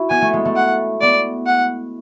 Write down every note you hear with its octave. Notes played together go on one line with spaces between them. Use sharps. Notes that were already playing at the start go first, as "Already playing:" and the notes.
Already playing: E4 F#4
B3 G#5
A3
G#3
A3
F#5
B3 D5
F#5